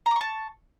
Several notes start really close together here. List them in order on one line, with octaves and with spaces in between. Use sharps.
A#5 D6 C#6 A5